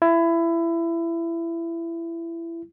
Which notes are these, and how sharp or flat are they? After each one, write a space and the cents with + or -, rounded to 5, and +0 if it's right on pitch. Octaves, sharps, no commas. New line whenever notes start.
E4 +20